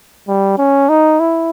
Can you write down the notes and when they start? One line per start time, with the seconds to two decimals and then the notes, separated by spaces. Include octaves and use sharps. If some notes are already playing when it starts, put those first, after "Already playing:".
0.28 G3
0.58 C#4
0.89 D#4
1.20 E4